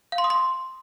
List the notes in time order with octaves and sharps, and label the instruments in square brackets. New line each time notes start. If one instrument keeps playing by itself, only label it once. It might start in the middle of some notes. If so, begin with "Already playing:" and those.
[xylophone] F5
C6
D#6
C6